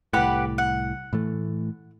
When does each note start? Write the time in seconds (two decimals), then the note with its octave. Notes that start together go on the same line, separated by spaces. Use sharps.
0.13 C2 A2 G4 B4 F#5
0.58 F#5
1.13 A2 E3 A3